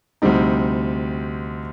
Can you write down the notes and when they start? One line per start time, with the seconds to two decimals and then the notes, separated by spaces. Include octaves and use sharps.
0.22 D2 C3 G3 C4 D#4